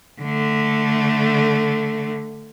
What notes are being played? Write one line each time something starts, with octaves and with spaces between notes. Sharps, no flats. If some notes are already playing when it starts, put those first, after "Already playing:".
D3 A3